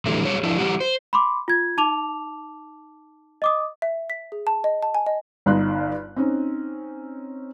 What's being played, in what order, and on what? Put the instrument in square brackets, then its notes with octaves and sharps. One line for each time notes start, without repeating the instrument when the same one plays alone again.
[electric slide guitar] A2 D3 E3 F#3 G3 A3
F#3 G3 G#4 C#5
F3 D4 E4
E3 G3 C#4 D#4 F#4 G4
C5
[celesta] B5 C6 D6
F4 G#6
D#4 A5 D6 F7
D#5 D6 D#6
[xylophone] E5
B6
G#4
A5
D#5
A5
G#5
D#5
[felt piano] G1 G2 D#4 C6 F#6
C4 C#4 D#4